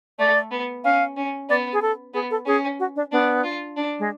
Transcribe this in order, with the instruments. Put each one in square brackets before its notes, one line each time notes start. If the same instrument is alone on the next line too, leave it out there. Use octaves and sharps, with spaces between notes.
[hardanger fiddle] A3 [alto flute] D5
[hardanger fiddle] B3
[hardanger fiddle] C#4 [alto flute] F5
[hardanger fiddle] C#4
[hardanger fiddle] B3 [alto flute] D5
[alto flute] G#4
A4
[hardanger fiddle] B3 [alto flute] G#4
[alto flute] A4
[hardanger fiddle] C#4 [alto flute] G#4
[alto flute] F#4
D4
[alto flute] B3 [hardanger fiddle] D4
[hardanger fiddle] F4
D4
[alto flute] G#3